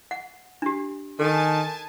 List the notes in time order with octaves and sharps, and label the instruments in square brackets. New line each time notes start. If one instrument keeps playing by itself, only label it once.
[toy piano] F#5
D4 G4
[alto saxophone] D#3 [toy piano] A4 [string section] G#5 A5